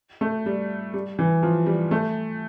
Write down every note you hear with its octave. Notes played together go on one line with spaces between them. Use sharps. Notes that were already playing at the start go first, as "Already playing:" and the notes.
A3
G3
G3
E3
F3
G3
A3